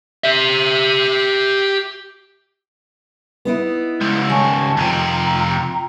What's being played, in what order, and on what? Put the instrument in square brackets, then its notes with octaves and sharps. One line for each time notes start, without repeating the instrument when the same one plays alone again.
[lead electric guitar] G4 E5
[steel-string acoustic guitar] B3 D#4 E4
[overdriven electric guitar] C#2 G#2 [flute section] E6
[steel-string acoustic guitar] D#3 G#3 G#5 [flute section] C#5 A5 C#6
[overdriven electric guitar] F2 C3 [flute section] F4 G5 A#5